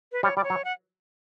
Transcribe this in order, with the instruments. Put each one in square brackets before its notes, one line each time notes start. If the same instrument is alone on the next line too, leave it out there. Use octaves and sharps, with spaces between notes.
[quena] B4
[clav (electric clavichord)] G3 [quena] C#5
[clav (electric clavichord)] G3 [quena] D5
[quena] C#5
[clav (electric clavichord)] F#3
[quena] F#5